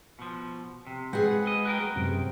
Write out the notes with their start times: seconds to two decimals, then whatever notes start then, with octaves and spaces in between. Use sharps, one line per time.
0.19 B2 F3
0.87 C3
1.13 G#3 C4 G#4 B4 F#5
1.47 D#5
1.65 F#4 A#4 G5
1.96 F#2 C3